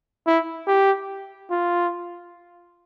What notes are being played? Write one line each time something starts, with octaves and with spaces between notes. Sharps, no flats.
E4
G4
F4